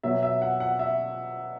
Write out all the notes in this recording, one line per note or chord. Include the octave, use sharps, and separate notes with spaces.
B2 F#3 E5
E5
F#5
F#5
E5